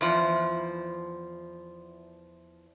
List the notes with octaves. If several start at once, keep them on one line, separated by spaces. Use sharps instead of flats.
E2 F3